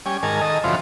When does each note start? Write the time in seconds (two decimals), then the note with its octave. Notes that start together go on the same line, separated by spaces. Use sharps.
0.06 G3 C#4 G#5
0.23 G#2 D#3 A#4 G#5 A5
0.41 D#3 A4 D#5
0.64 F#2 C#3 E3 F3 C4 F4